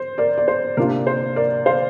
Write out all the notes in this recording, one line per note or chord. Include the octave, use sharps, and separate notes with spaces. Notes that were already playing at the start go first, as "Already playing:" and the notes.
Already playing: C5
A#4 D5
D5
C5
C3 A#3 D4 F4 A#4
C5
A#4 D5
C5 F5